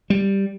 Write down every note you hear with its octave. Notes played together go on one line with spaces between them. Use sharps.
G3